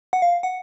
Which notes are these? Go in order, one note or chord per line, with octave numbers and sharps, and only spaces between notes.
F#5
F5
F#5